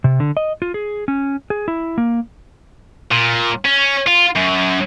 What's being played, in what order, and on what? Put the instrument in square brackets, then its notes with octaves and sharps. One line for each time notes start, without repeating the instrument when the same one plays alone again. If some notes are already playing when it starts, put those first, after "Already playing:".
[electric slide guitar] C3
D3
D#5
F4
G#4
C#4
G#4
E4
A#3
[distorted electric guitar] A#2
C#4
F4
F#2